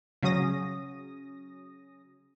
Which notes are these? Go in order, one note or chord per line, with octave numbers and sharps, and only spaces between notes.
C#3 F#3 C#4 D#6 A#6